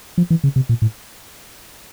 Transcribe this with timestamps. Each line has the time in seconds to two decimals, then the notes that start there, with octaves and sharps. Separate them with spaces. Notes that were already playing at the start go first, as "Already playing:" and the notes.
0.18 F3
0.30 E3
0.44 C#3
0.56 C3
0.69 A#2
0.82 A2